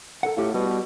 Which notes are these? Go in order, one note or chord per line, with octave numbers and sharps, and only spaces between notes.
A4 A#4 F#5
A2 F4 G4 F5
B2 G3 B4